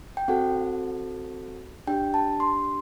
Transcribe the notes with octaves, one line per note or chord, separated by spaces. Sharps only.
G5
C4 F#4 A4 F#5
D4 G4 G5
A5
C6